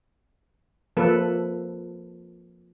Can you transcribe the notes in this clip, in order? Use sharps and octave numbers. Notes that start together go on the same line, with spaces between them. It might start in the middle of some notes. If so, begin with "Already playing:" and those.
F3 A#3 A4 B4